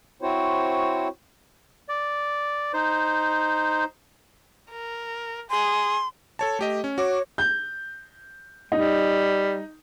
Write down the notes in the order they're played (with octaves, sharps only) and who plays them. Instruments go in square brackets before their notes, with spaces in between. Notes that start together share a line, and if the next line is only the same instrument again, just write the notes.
[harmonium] C4 E4 F#4 C5 C#5
[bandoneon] D5
D#4 C5
[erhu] A#4
[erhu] G#4 [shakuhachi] C6
[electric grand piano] A4 C#5 A5
A3 G4 D#5
C#4
[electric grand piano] F#4 D6 [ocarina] C#5
[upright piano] G6
[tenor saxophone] G3 [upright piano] D#4